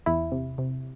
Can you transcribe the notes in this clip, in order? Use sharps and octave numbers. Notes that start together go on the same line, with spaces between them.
E2 E4
C3
C3